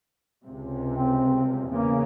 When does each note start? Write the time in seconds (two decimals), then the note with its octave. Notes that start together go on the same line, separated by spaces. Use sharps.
0.44 C#2 C3
0.91 C4
1.68 E2 C#3 A#3